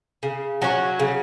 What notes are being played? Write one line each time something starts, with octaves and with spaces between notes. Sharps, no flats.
C#3
F#3 C#4 F#4
C#3